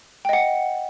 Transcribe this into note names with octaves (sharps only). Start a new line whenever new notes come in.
D#5 F#5 G5